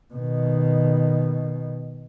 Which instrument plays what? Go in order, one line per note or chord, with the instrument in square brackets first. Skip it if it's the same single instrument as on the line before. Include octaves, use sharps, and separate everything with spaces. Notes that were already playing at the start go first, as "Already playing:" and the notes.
[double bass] B2 D#3